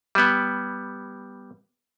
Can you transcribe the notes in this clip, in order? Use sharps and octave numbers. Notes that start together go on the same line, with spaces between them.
G3 B3